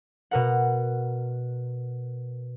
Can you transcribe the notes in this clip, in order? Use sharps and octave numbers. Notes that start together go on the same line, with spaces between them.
B2 A#4 F#5